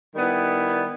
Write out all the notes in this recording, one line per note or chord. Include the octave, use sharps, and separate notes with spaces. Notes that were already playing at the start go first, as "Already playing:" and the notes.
D#3 G3 B3 E4